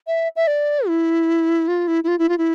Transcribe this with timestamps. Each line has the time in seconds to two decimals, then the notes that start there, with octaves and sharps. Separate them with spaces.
0.07 E5
0.36 E5
0.47 D5
0.88 E4
1.68 F4
1.88 E4
2.04 E4
2.08 F4
2.19 E4
2.29 F4
2.38 E4